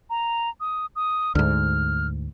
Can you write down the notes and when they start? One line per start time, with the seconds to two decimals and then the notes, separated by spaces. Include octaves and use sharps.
0.10 A#5
0.60 D#6
0.96 D#6
1.35 D2 G#2 F6